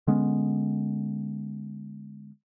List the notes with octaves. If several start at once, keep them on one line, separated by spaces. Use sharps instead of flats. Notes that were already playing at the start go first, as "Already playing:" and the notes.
D3 G#3 B3 C#4